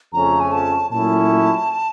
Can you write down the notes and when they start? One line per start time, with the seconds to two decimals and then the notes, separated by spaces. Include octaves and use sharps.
0.13 F2 C#3 F3 A3 C#4 A#5
0.40 G#5
0.52 A5
0.91 A#2 F#3 A3 C#4 E4 A5